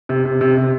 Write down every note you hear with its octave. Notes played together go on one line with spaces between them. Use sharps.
C3
C3
C3
C3